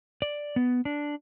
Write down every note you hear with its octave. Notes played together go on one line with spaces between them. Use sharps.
D5
B3
D4